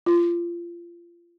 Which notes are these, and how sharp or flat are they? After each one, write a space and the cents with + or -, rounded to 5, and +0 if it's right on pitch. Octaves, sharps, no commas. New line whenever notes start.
F4 -25